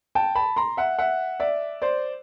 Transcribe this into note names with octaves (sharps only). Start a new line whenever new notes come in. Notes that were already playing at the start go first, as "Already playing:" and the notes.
G5 A5
A5 B5
A#5 C6
E5 F#5
E5 F#5
D5 E5
C5 D5